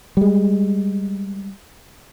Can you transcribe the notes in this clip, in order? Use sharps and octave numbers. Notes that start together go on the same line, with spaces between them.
G3 G#3